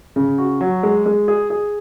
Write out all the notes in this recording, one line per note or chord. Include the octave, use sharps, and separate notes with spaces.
C#3
F#4
F#3
G#3
G#3
G#4
G#4